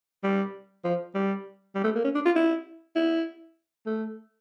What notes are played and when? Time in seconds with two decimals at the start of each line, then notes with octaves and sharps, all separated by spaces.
0.24 G3
0.84 F3
1.15 G3
1.75 G3
1.84 A3
1.95 A#3
2.04 C#4
2.15 D4
2.26 F4
2.36 E4
2.96 E4
3.86 A3